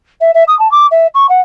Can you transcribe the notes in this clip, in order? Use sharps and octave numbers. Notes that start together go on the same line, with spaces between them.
E5
E5
D#6
A5
D6
E5
C#6
F#5